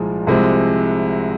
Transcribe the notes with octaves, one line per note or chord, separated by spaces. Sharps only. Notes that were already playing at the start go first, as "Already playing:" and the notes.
Already playing: C2 A#2 F3 G#3
C2 C3 F3 G#3